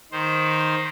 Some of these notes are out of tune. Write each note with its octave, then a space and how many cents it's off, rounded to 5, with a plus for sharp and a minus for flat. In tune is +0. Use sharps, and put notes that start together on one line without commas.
D#3 +0 C5 +0